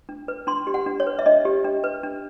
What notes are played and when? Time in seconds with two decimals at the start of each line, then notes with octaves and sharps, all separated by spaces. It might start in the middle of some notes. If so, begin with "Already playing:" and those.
0.09 D4
0.28 B4
0.47 D4 C6
0.67 G4
0.74 F#5
0.86 D4
1.00 C#5
1.06 B4
1.19 E5
1.26 D4 D#5
1.45 G4
1.65 D4
1.84 B4
2.04 D4